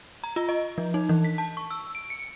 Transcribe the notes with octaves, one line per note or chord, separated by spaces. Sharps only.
A#5
F4
D#5
F3
D#4
E3
B6
A5
C#6
E6
D7
C#7